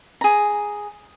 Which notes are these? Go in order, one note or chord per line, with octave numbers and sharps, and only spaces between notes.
G#4 A#5